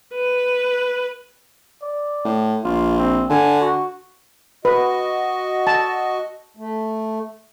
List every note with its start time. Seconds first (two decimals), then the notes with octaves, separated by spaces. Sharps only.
0.14 B4
1.82 D5
2.25 A2
2.64 A#1 F4
2.98 C4
3.30 D3 G#5
3.61 F#4
4.65 F#4 B4 D#5
5.67 A5
6.57 A3